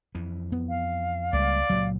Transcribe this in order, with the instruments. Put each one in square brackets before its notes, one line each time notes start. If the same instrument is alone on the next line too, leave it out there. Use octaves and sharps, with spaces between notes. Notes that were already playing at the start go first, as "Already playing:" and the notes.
[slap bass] F2 E3
[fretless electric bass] B3
[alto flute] F5
[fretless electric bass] C#2 [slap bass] G3 A#3 [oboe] D5
[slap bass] C#2 A#2 [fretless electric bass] F#3